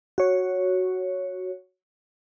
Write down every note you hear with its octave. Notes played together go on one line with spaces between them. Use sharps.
F#4 C#5